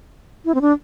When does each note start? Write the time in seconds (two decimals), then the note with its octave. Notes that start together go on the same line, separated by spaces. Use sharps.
0.45 E4
0.55 C4
0.61 D4